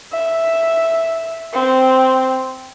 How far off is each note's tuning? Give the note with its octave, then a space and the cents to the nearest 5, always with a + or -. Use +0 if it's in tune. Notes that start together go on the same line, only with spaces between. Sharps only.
E5 +0
C4 -5